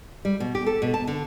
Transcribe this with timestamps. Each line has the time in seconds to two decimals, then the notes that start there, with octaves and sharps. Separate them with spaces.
0.25 G3
0.40 B2
0.55 G4
0.66 A4
0.82 B2
0.94 A5
1.07 D3